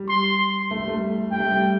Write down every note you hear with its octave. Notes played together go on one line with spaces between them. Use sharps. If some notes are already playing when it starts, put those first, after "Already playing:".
Already playing: G3
C6
A3
G3
A3
G3 G5
A3
G3